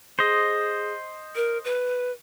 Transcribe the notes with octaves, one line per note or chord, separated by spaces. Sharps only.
G#4 C5 D#5
A#4
B4